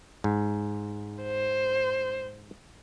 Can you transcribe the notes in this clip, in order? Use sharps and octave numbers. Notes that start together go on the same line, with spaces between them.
G#2
C5